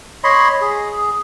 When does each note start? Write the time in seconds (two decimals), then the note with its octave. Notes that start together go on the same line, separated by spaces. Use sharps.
0.24 C#5 D#5 B5 C6
0.61 G#4